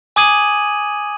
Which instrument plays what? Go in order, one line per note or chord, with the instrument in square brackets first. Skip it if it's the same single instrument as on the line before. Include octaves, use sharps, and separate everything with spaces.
[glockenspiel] G#5 D6 D#6 G#6 D#7 F#7